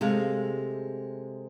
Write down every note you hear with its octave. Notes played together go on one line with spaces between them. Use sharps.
C3 G#3 A3 F5